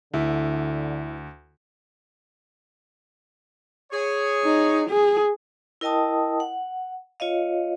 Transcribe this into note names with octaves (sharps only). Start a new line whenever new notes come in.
D2 D3 E4
G#4 C#5
D#4
G#4
E4 A#4 D#5 G5 A5 D#6
F#5
F4 C#5 D#5 F5